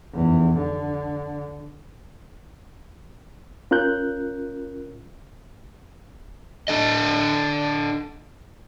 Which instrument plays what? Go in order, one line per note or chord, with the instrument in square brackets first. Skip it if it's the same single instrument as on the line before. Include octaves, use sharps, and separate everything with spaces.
[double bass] F1 E2
D3
[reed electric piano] C#4 F4 A#4 F#6 G6
[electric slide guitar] D4 A4 D#5